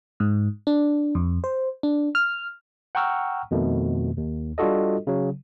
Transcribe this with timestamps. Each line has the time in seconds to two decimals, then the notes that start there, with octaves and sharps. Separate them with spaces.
0.20 G#2
0.67 D4
1.15 F2
1.44 C5
1.83 D4
2.15 F6
2.95 F#5 G5 A#5 C#6 E6 F6
3.51 F2 B2 D#3 A3
4.17 D#2
4.58 G3 D4 F4 F#4 A4 D#5
5.07 C#3 F#3